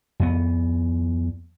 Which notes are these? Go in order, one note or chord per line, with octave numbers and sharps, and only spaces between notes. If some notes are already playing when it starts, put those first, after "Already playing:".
F2 B3